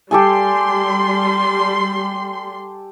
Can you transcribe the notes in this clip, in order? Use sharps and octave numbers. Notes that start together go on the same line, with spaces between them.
G3 G4 A4 G#5 C6